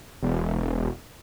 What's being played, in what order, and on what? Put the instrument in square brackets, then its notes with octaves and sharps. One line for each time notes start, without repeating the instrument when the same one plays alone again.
[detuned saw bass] E1